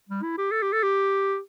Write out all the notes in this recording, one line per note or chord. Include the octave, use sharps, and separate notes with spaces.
G3
E4
G4
A4
G4
A4
G4